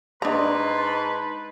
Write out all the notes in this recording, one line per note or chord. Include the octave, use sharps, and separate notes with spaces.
G#2 D4 D#4 B4 A5 A#5 C6